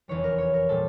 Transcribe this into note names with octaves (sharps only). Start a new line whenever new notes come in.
F1 E2 E3 G3 C#5
A#4
C#5
A#4
A#2 G3 A4